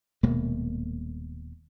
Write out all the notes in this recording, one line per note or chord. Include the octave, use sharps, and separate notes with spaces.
D#1 B2 G#3 A#3